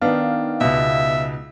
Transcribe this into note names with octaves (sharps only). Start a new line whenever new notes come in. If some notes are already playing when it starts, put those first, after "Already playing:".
D#3 B3 D4 D#4 F5
C#2 B2 E5